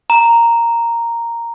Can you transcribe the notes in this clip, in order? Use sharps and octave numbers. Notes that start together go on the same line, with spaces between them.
A#5